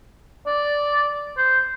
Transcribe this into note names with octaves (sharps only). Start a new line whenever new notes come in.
D5
C5